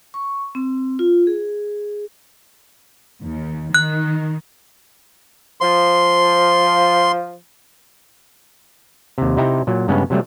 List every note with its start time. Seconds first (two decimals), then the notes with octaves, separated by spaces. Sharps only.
0.14 C#6
0.55 C4
0.99 F4
1.27 G#4
3.22 D#2
3.74 D#3 F#6
5.61 F3 C6
9.18 D#2 C3
9.37 C3 D#4 E4 G5 A#5
9.67 A#2 F#3
9.88 G2 C#3 G#3 B3 C#4
10.10 C3 F#3 G3 A3